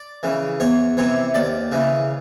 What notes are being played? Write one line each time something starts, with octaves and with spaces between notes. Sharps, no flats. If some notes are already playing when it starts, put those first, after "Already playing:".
Already playing: D5
C#3 E3
E2 C#5
C3 E3 C#5
D#2 D5
C#3 E3